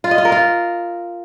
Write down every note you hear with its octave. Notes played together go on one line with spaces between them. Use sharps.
F4
D#5
F4
A#4
F4